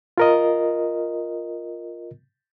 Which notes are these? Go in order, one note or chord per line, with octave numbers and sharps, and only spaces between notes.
F4 A#4 D#5